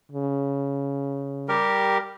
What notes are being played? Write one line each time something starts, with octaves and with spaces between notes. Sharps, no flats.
C#3
G3 G4 A#4